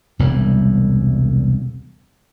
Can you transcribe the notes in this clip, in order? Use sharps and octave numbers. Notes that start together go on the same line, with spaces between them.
E1 C2 A2 G3